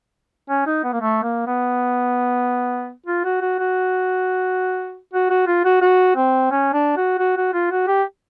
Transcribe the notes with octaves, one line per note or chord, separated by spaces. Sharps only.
C#4
D#4
B3
A#3
A3
A#3
B3
F4
F#4
F#4
F#4
F#4
F#4
F4
F#4
F#4
C4
C#4
D4
F#4
F#4
F#4
F4
F#4
G4